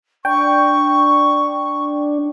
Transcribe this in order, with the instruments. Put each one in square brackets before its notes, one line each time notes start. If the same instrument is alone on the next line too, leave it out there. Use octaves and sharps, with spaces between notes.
[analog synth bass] D4 [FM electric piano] G5 [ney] C#6